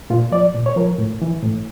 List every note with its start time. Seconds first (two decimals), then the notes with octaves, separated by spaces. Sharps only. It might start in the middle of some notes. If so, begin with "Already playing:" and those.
0.10 A#2 F4
0.32 F3 D5
0.54 A#2
0.66 C#5
0.76 F3 A#4
0.98 A2
1.22 E3
1.43 A2